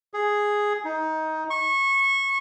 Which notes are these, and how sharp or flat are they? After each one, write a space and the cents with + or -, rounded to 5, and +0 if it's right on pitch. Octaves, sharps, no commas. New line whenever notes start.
G#4 +0
D#4 +20
C#6 -20